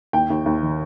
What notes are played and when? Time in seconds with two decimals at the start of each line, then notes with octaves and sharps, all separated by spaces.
0.13 D#2 G5
0.30 D#2
0.46 D#2
0.62 D#3